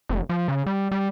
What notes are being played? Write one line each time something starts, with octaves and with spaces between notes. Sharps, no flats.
F1
F3
C#3
G3
G3